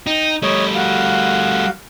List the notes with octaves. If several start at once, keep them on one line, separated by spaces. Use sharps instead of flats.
D#4 G5
G3 A3 C#5 D#5
F#4 F5